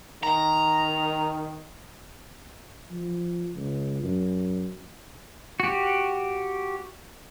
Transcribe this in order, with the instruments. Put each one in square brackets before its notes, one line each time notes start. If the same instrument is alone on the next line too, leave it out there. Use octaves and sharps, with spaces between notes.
[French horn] D#3 [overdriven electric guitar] A#5
[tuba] F3
C#2
F#2
[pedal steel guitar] F#4 G4